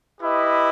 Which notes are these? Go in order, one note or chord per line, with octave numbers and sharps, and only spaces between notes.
E4 G4 B4 D#5